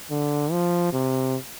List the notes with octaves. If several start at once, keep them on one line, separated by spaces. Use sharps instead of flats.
D3
F3
C3